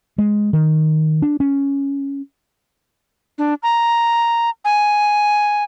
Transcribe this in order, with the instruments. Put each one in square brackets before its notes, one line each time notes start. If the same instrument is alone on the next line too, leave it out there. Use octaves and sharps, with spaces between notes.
[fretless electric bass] G#3
D#3
D4
C#4
[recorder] D4
A#5
G#5